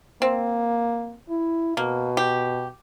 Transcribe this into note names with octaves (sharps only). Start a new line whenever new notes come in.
A#3 C4
E4
B2 A#3
G4